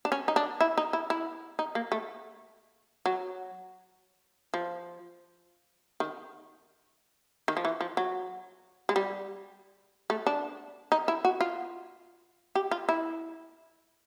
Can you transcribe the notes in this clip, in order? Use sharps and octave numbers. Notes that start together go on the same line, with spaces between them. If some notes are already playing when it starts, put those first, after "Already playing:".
D4
C#4
D#4
D4
E4
D#4
E4
E4
D#4
A#3
A3
F#3
F3
D#3
D#3
F3
E3
F3
F#3
G#3
G3
A3
D4
D#4
E4
F#4
F4
G4
F4
E4